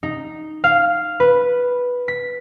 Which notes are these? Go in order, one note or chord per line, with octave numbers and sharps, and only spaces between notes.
D#4
F5
B4
B6